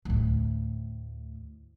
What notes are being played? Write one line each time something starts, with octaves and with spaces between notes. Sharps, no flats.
D2 A2